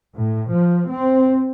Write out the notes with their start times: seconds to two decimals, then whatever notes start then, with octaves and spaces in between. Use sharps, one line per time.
0.15 A2
0.51 F3
0.91 C4